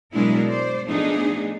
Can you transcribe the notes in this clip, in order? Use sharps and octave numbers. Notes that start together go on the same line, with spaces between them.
B2 F#3 G#3 D4 E4 A#4
C5 D5
F3 A3 B3 D4 D#4 G#4